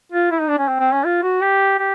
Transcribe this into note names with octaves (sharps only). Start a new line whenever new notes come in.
F4
E4
D#4
D4
C#4
C4
C4
C#4
F4
F#4
G4
G4